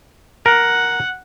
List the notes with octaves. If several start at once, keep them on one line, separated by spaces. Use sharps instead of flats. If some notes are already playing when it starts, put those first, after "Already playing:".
A#4 F#5